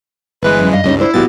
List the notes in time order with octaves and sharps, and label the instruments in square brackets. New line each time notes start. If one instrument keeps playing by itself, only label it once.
[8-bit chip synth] G1 E3 G#3 [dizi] B4
[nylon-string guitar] F#2
[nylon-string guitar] G2 F5 [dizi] D#5
[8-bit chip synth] C#2 G2 [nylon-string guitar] G3 C#4 D#4
[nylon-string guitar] D4 C5 [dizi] E4
[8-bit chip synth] A1 A#2 A6 [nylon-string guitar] B3 F#4 G4